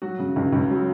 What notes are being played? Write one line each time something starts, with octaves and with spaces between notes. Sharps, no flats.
F#3 F#4
C#3
C#2
C#2
F#3